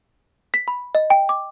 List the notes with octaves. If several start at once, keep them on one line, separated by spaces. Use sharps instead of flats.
B6
B5
D#5
G5
D6